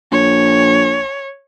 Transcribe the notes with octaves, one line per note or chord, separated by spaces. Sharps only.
A#1 C#5